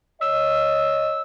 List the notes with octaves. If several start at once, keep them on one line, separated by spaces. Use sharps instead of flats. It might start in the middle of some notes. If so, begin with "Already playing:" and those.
C#5 D#5 E6